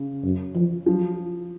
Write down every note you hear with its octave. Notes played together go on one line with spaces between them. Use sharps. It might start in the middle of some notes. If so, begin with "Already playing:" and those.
Already playing: C#3
F#2
F3
F3 F#3